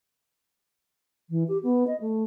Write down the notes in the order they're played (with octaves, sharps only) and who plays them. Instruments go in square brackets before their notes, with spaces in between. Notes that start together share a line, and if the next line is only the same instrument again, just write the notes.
[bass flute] E3
G4
B3
D#5
A3